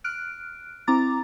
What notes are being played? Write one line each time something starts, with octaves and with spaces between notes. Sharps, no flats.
F6 F#6 D7
C4 E4 A#5 D6 A6